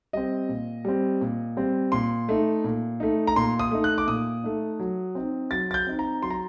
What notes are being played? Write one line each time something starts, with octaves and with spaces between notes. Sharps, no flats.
G3 C4 D#5
A#2
G3 C4
A#2
G3 C4
A#2 C6
A3 D#4
A#2
A3 D#4
A#5
A#2 C6
D#6
A3 D#4
F#6
D6
A#2 D#6
A3 D#4
F#3
C4 D#4
F#3 A6
A6
G6
C4 D#4
A#5
F#3 C6
A#5